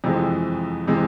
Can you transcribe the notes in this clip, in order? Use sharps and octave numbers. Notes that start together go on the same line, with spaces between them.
F2 C3 E3 G#3
C3 E3 G#3